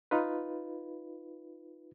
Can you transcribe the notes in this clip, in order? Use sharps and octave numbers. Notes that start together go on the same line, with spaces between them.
D#4 F4 B4